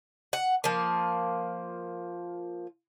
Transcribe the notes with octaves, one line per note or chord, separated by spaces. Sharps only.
F#5
F3 A#3